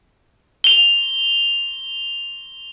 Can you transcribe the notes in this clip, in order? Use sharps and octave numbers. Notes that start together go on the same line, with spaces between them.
F7 G7